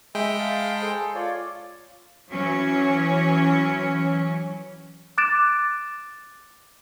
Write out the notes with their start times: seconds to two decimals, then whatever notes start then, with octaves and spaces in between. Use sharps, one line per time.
0.15 G#3 E5 G5 B5
0.39 F5 A5 B5
0.81 G#4 A4 C5
1.00 A4 C6
1.15 F4 C#5 D5
2.34 E3 F#3 C#4
5.18 D6 F#6 A6 D7 E7